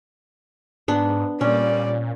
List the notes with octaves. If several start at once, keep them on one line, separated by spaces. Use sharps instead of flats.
G#2 B3 D4
A#2 G3 C#4 D5